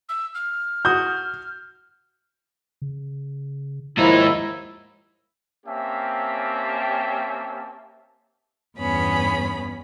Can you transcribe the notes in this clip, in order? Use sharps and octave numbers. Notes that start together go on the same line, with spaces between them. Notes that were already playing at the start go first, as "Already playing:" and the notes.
E6
F6
F#4 D#6 G6
C#3
D#2 G#2 F3 D#4 E4
A#3 C4 C#4 G4 E5 A5
E2 G2 B3 C#4 B5